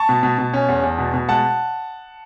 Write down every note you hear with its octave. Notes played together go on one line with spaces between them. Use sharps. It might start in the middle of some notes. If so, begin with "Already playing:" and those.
Already playing: A5 C#6
B2
B2
B2
C#4
E2
E2
B2
B2
G#3 F#5 A5